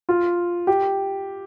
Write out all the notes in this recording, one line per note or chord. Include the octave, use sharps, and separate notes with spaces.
F4
G4